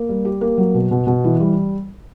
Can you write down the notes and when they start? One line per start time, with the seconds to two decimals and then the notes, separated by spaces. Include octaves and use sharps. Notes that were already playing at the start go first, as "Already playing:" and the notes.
Already playing: A#3
0.09 G3
0.25 G4
0.41 A#3
0.58 F#3
0.74 B2
0.91 B2
1.07 B2
1.24 E3
1.40 G3